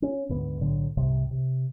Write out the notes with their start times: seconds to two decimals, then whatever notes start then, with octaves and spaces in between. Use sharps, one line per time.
0.02 C#4
0.29 D2 G#2 B3
0.61 B1 A2 D3
0.97 C2 G#2 C3
1.31 C3